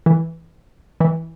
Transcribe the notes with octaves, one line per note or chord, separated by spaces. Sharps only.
E3
E3